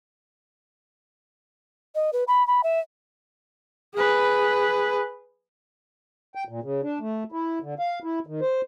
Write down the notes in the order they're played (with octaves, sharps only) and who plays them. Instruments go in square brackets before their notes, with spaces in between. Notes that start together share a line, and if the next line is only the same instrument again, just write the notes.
[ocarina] D#5
B4
B5
B5
E5
[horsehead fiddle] G#4 B4
[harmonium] G5
A#2
C#3
D4
A3
E4
D3
F5
E4
D#3
C5